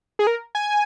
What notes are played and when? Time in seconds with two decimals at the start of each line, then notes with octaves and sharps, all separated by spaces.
0.19 G#4
0.27 A#4
0.55 G#5